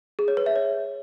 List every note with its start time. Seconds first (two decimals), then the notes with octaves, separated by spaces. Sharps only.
0.19 G#4
0.28 C#5
0.37 B4
0.46 E5
0.56 C#5